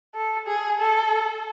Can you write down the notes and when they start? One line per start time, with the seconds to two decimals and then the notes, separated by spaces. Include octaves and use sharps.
0.15 A4
0.47 G#4
0.79 A4